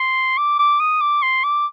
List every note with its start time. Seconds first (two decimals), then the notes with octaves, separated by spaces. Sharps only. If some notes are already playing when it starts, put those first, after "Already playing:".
Already playing: C6
0.38 D6
0.59 D6
0.80 D#6
1.01 D6
1.23 C6
1.44 D6